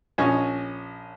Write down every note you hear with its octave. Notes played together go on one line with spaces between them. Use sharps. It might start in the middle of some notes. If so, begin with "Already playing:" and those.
A#1 C#4 C#5 D#5